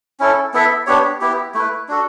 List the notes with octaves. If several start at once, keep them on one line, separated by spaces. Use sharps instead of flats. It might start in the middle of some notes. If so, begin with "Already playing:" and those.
C#4 E4 A4
B3 E4 A4 E5
B3 D4 G4 C#5
B3 E4 G4
A3 E4 B4
D4 F#4 A4